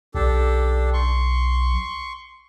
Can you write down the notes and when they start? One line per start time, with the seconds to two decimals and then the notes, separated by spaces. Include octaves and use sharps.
0.15 B1 D4 G4 A4
0.93 C6 C#6